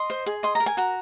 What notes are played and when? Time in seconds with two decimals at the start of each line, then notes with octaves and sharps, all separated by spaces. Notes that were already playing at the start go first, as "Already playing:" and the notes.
Already playing: D#5 C6
0.10 C5
0.26 G#4
0.43 D#5 C6
0.55 A#5
0.60 A#4
0.66 G#5
0.77 F#4 A#5